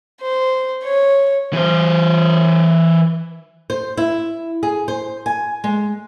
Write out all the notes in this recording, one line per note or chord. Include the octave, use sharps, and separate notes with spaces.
C5
C#5
E3 C5
C5
E4
G#4
C5
G#5
G#3